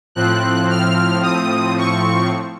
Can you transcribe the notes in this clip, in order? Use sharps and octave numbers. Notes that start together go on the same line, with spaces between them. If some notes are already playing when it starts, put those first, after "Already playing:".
A2 F3 C4 F#6
F6
D#6
C#6